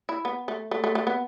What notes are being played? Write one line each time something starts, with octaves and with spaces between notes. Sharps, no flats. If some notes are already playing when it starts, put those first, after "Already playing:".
E4
B3
A3
A3
A3
A3
B3